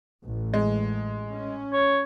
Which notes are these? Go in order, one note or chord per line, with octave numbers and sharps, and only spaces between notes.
A1
G#3
C#4
C#5